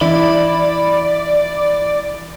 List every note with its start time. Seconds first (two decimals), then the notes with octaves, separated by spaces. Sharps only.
0.01 E3 E4 D5 B5